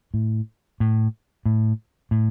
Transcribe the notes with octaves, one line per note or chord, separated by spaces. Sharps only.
A2
A2
A2
A2